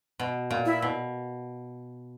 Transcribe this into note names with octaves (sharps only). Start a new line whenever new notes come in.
B2
A#2
E4
B2